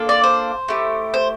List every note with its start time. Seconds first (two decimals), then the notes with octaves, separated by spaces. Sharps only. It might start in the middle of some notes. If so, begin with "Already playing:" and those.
Already playing: A#3 D4 F4 A4
0.09 D5
0.24 C5
0.68 A3 E4 G4
1.14 C5